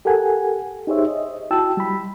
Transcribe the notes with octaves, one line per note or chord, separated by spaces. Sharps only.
G4 A4 A#4 F#5 G#5
D#4 G4 G#4 C5 C#5 E5
D#5
E4 F#4 G5 A5 E6
G3 B5